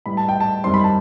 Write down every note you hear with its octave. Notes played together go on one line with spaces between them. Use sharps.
A2 G3 B3 B5
A5
G5
A5
F#2 D#3 G3 C4 C6
B5
A5